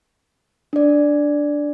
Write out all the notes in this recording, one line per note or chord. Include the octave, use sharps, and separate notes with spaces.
D4 D5